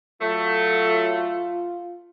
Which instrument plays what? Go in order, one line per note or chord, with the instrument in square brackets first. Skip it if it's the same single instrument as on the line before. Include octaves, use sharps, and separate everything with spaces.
[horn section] F#3 A3 [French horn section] F4